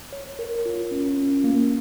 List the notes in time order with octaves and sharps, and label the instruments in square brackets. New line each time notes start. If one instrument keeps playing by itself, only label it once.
[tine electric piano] C#5
A#4
F4
C#4
C#4
A#3